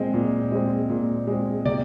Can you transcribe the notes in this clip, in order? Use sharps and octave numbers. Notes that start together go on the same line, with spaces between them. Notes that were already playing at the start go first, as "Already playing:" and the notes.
Already playing: A#2 G#3 C4
A#2
G#3 C4
A#2
G#3 C4
C3 D5